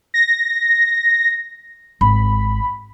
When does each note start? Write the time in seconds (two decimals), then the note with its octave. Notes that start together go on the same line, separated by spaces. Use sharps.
0.14 A#6
2.01 G#1 B5